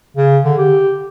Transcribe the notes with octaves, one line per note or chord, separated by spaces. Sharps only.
C#3
D3
G4